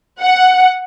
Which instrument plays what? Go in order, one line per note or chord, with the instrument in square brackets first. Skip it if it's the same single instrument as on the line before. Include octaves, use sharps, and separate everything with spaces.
[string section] F#5